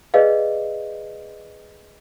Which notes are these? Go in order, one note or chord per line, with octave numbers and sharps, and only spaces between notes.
G#4 B4 D5 D#5 F5